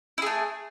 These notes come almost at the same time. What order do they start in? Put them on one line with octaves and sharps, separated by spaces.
E4 G#4 A3